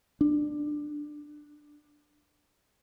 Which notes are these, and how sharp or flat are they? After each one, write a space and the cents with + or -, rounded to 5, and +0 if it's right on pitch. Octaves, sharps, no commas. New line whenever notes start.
D4 +15